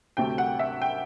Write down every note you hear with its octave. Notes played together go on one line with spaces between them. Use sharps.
D2 C3 F#3 A3 G5
F#5
E5
G5